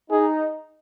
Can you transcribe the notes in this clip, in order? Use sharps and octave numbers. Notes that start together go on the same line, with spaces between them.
D#4 G#4